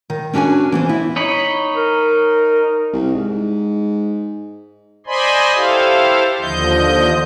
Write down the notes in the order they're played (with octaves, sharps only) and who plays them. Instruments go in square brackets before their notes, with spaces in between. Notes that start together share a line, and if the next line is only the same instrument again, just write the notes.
[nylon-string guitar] D#3
C#4 D4 F#4 B4 G#5
E3 B3 C5
E4
[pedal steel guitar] D#4 C#5 B5
[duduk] A#4
[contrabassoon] C2
G#2
[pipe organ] C5 D5 D#5 G#5 B5 C6
E4 G4 A4 C5 F5
D#2 D3 F3 D#5 G6